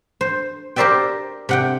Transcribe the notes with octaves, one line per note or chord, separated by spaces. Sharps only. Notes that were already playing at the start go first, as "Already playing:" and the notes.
C5
G4 A#4 C5 D5 E5 G5
C3 F#5 G5